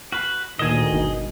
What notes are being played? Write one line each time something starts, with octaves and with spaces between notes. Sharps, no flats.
F#4 B4 F6 C7
D2 A#2 D#3 G#4 D#5 G#6 E7
G1 B2 D#4